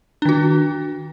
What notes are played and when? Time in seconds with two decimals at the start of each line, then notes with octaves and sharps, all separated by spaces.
0.22 D4
0.25 D#3
0.29 F#4